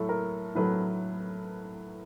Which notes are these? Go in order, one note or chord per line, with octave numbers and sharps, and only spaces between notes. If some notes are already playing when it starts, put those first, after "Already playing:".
Already playing: A2 F#3 A3 A4
A#4
A2 F#3 A3 B4